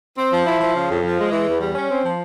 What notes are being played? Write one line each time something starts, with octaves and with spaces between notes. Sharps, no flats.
C4
F3
E4
F3
C#3
F2
F3
G#3
E3
E2
G3
C#4
C4
F3